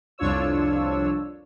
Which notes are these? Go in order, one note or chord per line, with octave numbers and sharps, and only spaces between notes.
C2 F2 D4 F4 C#5 E6